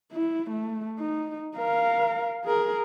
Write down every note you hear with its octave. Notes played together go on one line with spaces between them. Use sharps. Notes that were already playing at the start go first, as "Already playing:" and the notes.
E4
A3
D#4
A#4 F5
G#4 A#4